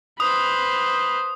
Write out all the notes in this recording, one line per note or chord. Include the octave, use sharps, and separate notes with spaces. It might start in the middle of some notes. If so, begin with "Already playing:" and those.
B4 C5 D#6